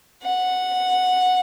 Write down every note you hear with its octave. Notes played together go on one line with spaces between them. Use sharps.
F#5